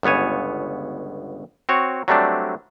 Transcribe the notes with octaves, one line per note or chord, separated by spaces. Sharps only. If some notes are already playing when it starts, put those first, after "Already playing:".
G1 C#2 B3 C#5 G#5
C4 F#4 C#5
F#3 G3 A3 C4 D4